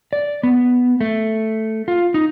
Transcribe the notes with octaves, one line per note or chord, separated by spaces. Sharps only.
D5
B3
A3
F4
D#4